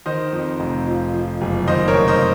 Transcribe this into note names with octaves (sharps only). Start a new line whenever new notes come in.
D#3 C5 D#5
F2
F1
F3
F3
F#1
D#3 C5 D#5
A#4 C#5
F1
C5 D#5